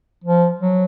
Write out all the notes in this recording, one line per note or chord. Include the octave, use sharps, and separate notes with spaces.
F3
F#3